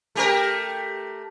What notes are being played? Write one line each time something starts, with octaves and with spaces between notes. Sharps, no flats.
A3 G4 A#4